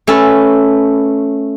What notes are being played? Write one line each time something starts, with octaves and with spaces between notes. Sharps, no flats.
A3 C#4 A4 B4